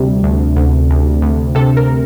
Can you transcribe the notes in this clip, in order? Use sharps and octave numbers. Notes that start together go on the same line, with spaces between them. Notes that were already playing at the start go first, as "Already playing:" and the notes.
Already playing: D2 C3 G3
D2
D2
D2
D2
C3 A4
A#4